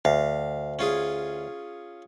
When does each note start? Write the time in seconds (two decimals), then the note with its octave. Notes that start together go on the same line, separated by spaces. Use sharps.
0.05 D2 F5
0.79 C#4 F4 G#4